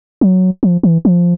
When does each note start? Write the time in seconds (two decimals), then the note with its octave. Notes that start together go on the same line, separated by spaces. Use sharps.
0.21 F#3
0.63 F3
0.83 E3
1.05 F3